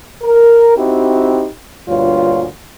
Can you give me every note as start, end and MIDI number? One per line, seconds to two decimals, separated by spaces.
0.22 0.76 70
0.76 1.45 60
0.76 1.45 63
0.76 1.45 64
0.76 1.45 66
0.76 1.45 67
1.87 2.46 38
1.87 2.46 43
1.87 2.46 46
1.87 2.46 65
1.87 2.46 73